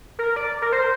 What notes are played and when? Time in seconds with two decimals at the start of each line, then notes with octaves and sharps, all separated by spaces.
0.19 A#4
0.36 D5
0.62 A#4
0.72 C5